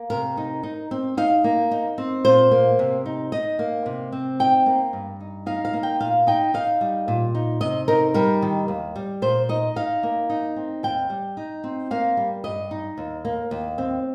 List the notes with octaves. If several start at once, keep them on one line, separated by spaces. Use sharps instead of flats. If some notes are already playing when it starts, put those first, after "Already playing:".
Already playing: A#3
C3 A#4
D#4
D#4
C4
D#4 F5
A#3
D#4
C4
A#2 C5
A#3
C3
D#4
D#4 D#5
A#3
C3
C4
D#4 G5
A#3
G2
D#4
D#4 F5
F5
A#3
G5
A#2 F5
D#4 G5
D#4 F5
G3
A#2
D#4
C3 D#5
D#4 A#4
G3 A#4
D#3
D#2
G3
A#2 C5
D#4 D#5
D#4 F5
A#3
D#4
C4
D#2 G5
G3
D#4
C4
A#3 F5
G3
G2 D#5
D#4
D#2
A#3
D#2
C4